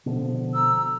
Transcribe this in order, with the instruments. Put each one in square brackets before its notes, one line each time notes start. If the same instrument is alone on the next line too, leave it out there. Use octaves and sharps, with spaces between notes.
[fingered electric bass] B2 D3 F3
[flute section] A#5 E6